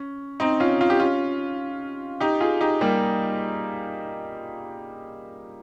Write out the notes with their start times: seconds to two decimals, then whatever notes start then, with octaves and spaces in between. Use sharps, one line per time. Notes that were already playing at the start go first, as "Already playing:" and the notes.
Already playing: C#4
0.40 C4 D#4
0.60 C#4 F4
0.81 F4
0.90 G4
0.99 C#4 F4
2.20 D#4 G4
2.40 F4 G#4
2.60 D#4 G4
2.81 G3 A#3